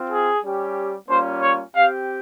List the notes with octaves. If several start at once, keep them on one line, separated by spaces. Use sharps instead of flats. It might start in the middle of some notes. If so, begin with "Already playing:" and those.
Already playing: C4 F4
G#4
G3 C#4 G4
G3 A#3 C#4 F4 C5
C#5
C4 G4 F5